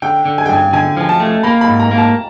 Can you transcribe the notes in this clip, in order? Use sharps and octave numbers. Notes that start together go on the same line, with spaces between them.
D3 G5
D3
G#5
G5
G2 G#5
D3 G#5
F3 G#5
A5
A3
A#3 B5
B5
G#2
A#5
A#3
A5